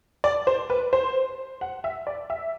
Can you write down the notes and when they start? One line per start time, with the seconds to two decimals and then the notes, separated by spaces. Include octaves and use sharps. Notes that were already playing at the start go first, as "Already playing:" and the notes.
0.24 D5
0.47 C5
0.70 B4
0.93 C5
1.61 F#5
1.84 E5
2.07 D5
2.30 E5